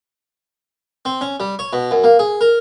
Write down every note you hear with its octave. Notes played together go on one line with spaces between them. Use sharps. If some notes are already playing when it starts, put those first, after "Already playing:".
C4
C#4
G3
C#5
B2
F#2
A#3
G#4
A#4